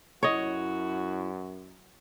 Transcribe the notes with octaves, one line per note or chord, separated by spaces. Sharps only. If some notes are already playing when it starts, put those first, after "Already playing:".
F#2 E4 F#4 C#5 D#5